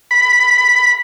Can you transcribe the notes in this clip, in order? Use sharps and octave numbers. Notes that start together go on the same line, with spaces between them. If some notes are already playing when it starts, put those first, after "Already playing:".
B5